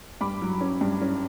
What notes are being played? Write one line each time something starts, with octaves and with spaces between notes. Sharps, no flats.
G2 B5 D6
F#3
C#4
G2
C#4